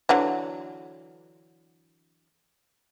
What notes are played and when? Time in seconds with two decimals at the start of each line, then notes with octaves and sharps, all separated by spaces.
0.09 D3 E3 F#3